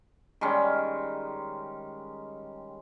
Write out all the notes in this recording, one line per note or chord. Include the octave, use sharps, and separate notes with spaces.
D#3 G3 G#3 C#4